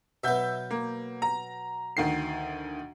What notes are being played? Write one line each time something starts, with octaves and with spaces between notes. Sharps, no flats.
B2 F#3 B3 E5 G6
A#3
A#5
D2 D#3 C7